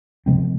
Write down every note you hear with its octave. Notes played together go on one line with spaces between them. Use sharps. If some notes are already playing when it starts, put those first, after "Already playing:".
C3 F3 G#3 C4